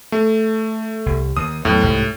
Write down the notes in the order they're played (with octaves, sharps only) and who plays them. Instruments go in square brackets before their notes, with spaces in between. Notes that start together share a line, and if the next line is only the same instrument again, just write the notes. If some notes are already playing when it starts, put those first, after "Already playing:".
[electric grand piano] A3
[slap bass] C2
[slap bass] D#2 [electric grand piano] D#6
[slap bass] E2 F#3 [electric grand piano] A2
[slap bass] C2 G#2